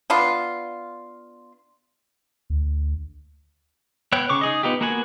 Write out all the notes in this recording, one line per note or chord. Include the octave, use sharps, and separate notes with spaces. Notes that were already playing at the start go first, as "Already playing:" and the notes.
B3 D4 F4
D2
B3 C#5 G5 F#6
C#3 C#6 D6
D#4 G#4 D#5
B3 D#4 F4 G4
A#3 B3 F#4 F#5 G#5